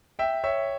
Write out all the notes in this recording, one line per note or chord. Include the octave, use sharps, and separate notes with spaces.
E5 G5
C#5 E5